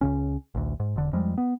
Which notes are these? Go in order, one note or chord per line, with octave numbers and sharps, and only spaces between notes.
C#2 C#3 C#4
A1 D2
G#2
E1 D3
F2 F3 G3 G#3
B3